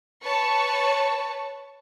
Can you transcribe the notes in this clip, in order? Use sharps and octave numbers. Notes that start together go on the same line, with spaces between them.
B4 C#5 A5 C#6